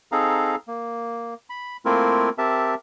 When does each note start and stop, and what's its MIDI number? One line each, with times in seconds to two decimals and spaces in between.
0.12 0.56 60
0.12 0.56 63
0.12 0.56 68
0.12 0.56 69
0.12 0.56 77
0.12 0.56 82
0.68 1.34 58
1.50 1.77 83
1.85 2.30 57
1.85 2.30 58
1.85 2.30 60
1.85 2.30 64
1.85 2.30 65
1.85 2.30 70
2.38 2.75 60
2.38 2.75 67
2.38 2.75 70
2.38 2.75 76
2.38 2.75 81